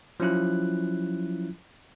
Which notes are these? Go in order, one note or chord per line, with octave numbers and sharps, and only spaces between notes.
F3 F#3 C#4 E4 F4 F#6